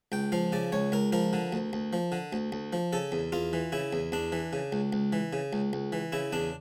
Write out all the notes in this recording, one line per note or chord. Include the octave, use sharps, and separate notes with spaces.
C#2 G5
F3 F5
C#3 D5
C#2 C#5
C#2 A#4
F3 A#4
D3
D2
D2
F3
D3
D2
D2
F3
C#3 A4
E2
E2 F4
E3
C#3 E4
E2
E2 D4
E3
C#3
C#2
C#2
E3
C#3
C#2
C#2
E3
C#3 E4
E2 D4